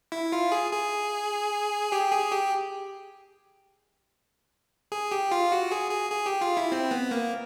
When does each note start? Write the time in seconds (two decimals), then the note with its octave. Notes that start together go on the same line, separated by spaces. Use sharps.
0.12 E4
0.32 F4
0.52 G#4
0.72 G#4
1.92 G4
2.12 G#4
2.31 G4
4.92 G#4
5.12 G4
5.31 F4
5.52 F#4
5.72 G#4
5.91 G#4
6.11 G#4
6.26 G4
6.41 F4
6.57 E4
6.72 C4
6.91 B3
7.11 A#3